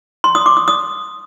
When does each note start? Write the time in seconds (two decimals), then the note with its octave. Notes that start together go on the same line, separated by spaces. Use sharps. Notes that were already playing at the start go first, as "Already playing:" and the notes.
0.24 C6
0.35 D#6
0.46 D6
0.57 D#6
0.68 D#6